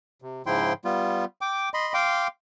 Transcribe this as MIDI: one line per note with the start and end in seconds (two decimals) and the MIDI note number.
0.22 0.42 48
0.46 0.73 44
0.46 0.73 49
0.46 0.73 53
0.46 0.73 64
0.46 0.73 79
0.46 0.73 84
0.85 1.25 55
0.85 1.25 59
0.85 1.25 65
1.41 1.69 79
1.41 1.69 86
1.74 1.94 75
1.74 1.94 83
1.74 1.94 84
1.94 2.27 77
1.94 2.27 79
1.94 2.27 84
1.94 2.27 86